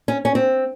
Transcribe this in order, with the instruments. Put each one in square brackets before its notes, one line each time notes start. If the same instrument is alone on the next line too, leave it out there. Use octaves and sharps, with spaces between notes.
[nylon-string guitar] C#4
C#4
C4